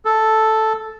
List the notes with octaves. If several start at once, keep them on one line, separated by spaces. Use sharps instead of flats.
A4